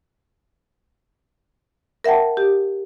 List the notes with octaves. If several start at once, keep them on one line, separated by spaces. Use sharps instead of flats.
A#4 E5 F#5 G5 A5
G4